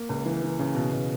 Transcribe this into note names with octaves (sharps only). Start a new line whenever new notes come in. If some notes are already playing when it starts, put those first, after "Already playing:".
Already playing: A#3
C#2
E3
E3
C#3
B2
B2